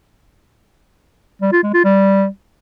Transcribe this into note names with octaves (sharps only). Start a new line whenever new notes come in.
G3
F4
G#3
F4
G3